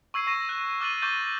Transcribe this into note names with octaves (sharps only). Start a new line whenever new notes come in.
C#6 E6 G#6 C7 D#7
C#6 E6 A#6 E7
F#6
D6 F6 F#6 A6 D#7 F#7
C#6 D6 F6 G6 A6 D#7